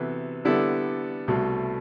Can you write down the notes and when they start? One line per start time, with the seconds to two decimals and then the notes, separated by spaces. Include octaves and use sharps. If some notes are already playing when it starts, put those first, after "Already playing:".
Already playing: C3 E3 B3 F#4 A4
0.45 D3 G3 B3 E4 A4
1.28 C2 B2 A3